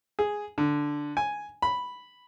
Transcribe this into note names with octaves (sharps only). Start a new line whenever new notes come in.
G#4
D3
G#5
B5